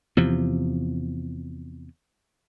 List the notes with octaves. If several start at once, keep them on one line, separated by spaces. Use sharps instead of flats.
E2 C3 F3